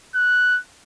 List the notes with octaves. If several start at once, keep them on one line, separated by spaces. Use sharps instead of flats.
F#6